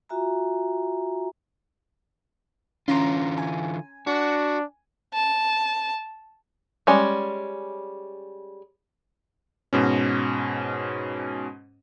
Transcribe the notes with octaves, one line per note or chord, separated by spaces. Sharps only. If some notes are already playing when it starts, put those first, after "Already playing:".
F4 F#4 E5 G#5 A#5
D3 E3 C#4 F4 A#5 C6
G#5
D4 F#4
A5
G3 G#3 C#4
G#2 B2 C#4